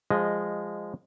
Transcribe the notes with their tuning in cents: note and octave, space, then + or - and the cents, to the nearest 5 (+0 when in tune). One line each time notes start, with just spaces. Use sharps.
F3 +0 G#3 -15 D#5 +0